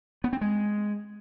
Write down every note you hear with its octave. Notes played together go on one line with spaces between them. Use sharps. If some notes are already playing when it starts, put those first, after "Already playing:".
B3
C4
G#3